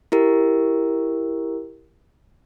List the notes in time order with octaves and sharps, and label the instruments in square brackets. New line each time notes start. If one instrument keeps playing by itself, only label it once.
[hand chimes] E4 G4 A#4